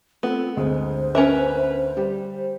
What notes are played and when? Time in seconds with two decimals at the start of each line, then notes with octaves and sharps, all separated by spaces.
0.23 A3 B3 C4 F4
0.57 G1 D2 G#3 C5
1.15 C#4 A#4 B4 E5
1.97 G3 G4